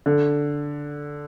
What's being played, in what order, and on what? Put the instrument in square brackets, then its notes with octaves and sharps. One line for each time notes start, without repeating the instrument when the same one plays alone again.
[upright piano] D3